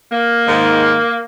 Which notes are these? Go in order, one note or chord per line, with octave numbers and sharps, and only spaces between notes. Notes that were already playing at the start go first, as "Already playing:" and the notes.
A#3
G#2 D#3